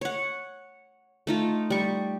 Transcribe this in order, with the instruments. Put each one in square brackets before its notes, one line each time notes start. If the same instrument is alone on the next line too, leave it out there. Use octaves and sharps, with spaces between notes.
[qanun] C#5 F#5
A3 D#4 F4
G3 C#6